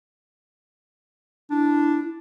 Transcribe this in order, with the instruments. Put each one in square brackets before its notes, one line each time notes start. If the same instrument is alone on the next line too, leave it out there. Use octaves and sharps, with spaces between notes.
[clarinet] D4 [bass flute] E4